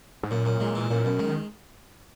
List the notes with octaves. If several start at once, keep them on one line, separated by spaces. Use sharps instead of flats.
G#2
F#2 A#2
F#2
A#2 G#3
E3
F#2 A#2
F#2 B2
D#3 G#3